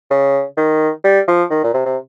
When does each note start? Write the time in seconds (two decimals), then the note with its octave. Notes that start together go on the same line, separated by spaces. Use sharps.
0.11 C#3
0.57 D#3
1.04 G3
1.28 F3
1.50 D#3
1.64 A#2
1.74 C3
1.86 C3